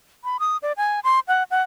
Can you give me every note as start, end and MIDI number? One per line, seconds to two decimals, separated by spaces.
0.24 0.37 83
0.40 0.57 87
0.63 0.72 74
0.77 1.00 80
1.04 1.20 84
1.28 1.43 78
1.51 1.63 78